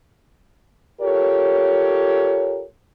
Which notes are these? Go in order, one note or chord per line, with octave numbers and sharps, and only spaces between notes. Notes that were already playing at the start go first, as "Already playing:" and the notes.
F4 G4 A4 A#4 C#5